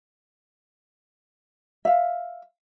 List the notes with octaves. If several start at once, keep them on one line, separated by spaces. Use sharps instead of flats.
E5 F5